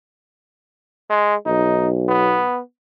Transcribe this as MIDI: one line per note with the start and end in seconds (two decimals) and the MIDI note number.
1.10 1.35 56
1.46 2.42 35
1.46 1.88 63
2.08 2.60 59